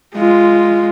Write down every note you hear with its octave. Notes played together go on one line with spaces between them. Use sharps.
G#3 F4